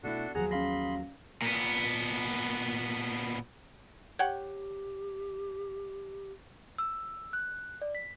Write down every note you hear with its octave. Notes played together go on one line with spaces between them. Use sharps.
B2 A3 D4 E4 F#4 A4
D#2 F3 F#3 G#4 F#5 A#5
C#4 F5 B5 C6 A#6
A#2 B3
G4 C#5 F#5 G5
E6
F#6
D5
B6